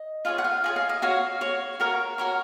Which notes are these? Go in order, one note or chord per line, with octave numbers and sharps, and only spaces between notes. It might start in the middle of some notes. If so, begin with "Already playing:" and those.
Already playing: D#5
F4 G#4 C#5 F5
F#5
F5
F4 G#4 C#5 D#5
F5
D#5
F#4 C#5 F5
F#4 C#5
F#4 A#4 C#5
F#4 A#4 C#5